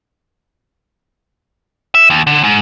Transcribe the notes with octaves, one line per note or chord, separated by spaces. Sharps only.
E5
D#2
D3
G#2